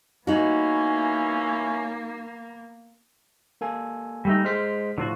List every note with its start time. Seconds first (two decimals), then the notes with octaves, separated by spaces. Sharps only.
0.27 E3 A#3 B3 C#4 D#4 F#4
3.61 A#3 A4 G#5
4.25 G3 A3 D#4
4.45 G#3 C5 F6 B6
4.98 A2 D3 F3 F4 F#4